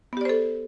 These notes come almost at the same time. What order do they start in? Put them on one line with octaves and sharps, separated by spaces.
B3 G4 D5 C5 A4